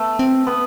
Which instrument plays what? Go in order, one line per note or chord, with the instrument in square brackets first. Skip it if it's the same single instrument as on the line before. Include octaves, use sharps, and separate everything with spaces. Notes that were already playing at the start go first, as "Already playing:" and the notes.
Already playing: [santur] A3 B3
[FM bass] C4
[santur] B3